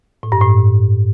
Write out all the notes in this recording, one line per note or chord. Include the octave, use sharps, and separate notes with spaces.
A2
G2
A2